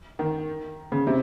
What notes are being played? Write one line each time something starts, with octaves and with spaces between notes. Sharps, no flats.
D#3
C#3
C3